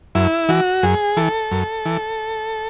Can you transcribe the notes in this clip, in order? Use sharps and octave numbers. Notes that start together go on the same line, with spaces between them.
F#2 E4
E3 F#4
F#2 G#4
E3 A4
F#2
E3